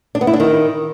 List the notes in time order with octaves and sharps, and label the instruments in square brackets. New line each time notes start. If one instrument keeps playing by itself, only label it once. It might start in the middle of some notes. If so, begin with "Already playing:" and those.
[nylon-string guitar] D4
B3
E4
D4
D#3